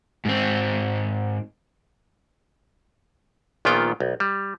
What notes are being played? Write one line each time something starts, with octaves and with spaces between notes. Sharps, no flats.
G#2 C4
A#1 A#2 D#3 B3 F4 G5
B1
G3